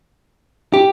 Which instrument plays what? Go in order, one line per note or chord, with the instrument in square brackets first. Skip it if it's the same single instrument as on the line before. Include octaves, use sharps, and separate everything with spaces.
[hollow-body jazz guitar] G4